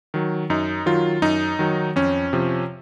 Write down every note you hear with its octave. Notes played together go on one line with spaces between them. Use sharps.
D#3 F#3
F#2 D#4
D#3 F#3 F4
F#2 D#4
D#3 F#3
F2 C#4
C3 F3